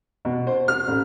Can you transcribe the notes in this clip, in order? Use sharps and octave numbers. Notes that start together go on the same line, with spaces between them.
B2
C5
F6
A1